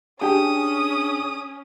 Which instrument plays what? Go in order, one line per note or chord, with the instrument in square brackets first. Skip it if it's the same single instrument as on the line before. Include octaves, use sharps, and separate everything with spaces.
[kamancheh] C#4 [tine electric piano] D4 G#4 [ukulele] G4 G5 [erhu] D#6